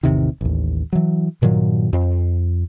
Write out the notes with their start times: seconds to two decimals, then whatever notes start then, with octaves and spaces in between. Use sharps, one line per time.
0.03 A1 E2 C3 D#3
0.41 A1 D#2
0.93 E3 F#3
1.42 G2 A#2 D#3 F#3
1.93 F2